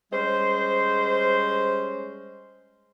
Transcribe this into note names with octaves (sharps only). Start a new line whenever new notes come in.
G3 G#3 C#4 C5